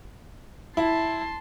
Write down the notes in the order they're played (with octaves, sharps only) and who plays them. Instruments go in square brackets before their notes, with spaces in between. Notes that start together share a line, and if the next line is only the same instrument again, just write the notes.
[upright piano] E4 [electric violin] A5 C6